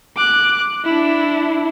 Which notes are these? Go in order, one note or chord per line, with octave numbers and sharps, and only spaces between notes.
D6 F#6
D4 E4